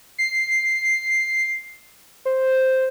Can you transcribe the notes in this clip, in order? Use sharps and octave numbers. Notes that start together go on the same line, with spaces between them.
C7
C5